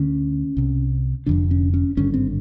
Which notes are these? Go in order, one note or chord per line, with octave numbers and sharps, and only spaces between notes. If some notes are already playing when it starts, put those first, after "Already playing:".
Already playing: D2 D3 C#4
C2 C3
F1 F2 D3 D4
C#4
C#4
G#1 G2 D3 C#4
C4